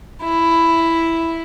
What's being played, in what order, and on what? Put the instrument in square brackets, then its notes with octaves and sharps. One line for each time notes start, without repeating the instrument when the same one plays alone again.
[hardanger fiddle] E4